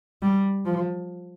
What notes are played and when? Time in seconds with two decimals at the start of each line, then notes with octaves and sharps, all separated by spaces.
0.22 G3
0.65 F3